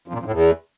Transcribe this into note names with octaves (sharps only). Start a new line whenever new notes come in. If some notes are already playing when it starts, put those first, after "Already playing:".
F2
A#2
F2
A2
E2